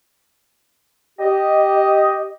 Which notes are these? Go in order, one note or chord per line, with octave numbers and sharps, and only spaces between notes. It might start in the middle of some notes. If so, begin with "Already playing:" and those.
G4 D#5